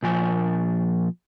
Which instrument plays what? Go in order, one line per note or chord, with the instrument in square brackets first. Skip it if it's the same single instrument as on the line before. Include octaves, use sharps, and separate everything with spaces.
[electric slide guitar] A#2 F3 G#5